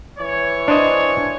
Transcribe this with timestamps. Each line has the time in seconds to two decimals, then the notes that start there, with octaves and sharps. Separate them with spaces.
0.19 E3 C#5
0.68 D4 C5 D#5